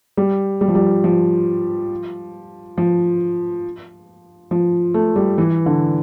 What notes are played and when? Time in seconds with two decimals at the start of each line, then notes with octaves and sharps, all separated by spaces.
0.17 G3
0.61 G3
0.68 F3
0.75 G3
1.04 F3
2.78 F3
4.51 F3
4.94 A3
5.16 G3
5.38 E3
5.66 D3